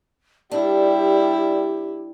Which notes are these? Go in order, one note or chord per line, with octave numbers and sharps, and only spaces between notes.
G3 D4 E4 G4